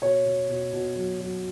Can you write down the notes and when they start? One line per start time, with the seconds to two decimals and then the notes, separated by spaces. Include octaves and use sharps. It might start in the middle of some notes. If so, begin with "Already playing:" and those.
0.01 B2 C#5
0.25 B2
0.49 B2
0.73 B2
0.96 F#3
1.20 F#3